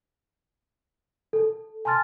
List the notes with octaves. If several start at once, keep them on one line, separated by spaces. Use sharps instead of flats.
A4
G#5 A5 C6 F6 A6